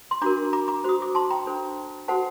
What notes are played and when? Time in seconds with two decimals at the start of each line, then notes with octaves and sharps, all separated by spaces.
0.11 C6
0.21 D4 F#4 A#4 A#5 D6
0.53 A#5 D6
0.68 A#5 D6
0.84 F#4 C5 D#6
1.02 D6
1.15 A5 C6
1.30 G5 A#5
1.46 D4 A4 C5
2.08 F#4 A4 C5 F#5 A5